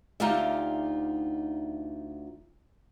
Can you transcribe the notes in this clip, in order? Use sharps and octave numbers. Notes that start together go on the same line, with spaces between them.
D2 D#4 F4 G4 D5 E5